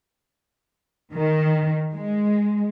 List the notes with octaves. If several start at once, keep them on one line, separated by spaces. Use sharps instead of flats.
D#3
G#3